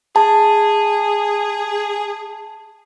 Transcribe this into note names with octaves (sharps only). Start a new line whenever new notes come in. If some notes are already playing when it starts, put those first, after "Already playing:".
G#4 A5